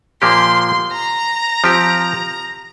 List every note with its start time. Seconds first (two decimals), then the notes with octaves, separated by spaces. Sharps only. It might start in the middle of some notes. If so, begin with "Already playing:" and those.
0.22 A#2 F3 A#3 G4 C6
0.92 A#5
1.64 F3 C4 G4